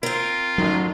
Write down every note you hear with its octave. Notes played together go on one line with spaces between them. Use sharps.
C4 F4 A#4
A1 F#2 D#3 F#3